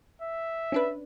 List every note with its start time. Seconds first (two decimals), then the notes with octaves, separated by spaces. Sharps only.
0.22 E5
0.72 C#4 D4 B4